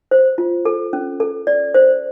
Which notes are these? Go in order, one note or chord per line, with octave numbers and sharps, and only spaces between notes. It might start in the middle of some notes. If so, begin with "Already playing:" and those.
C5
F4
A4
C#4
A4
D5
C5